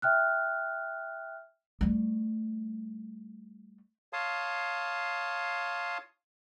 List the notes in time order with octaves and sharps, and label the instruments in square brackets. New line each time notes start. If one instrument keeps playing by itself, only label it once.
[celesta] E5 G5 F6 F#6
[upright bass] G3 A3
[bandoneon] C#5 F5 A5 C6 D#6